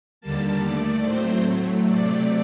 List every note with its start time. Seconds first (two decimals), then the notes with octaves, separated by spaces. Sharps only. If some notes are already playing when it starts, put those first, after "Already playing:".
0.21 D#2 D3 G3 A#3 A5
0.63 D#2 D#3 A3 D5
1.03 A2 F#3 A3 C4 C5
1.45 A2 F#3 A3
1.86 C3 F#3 A3 C4 D5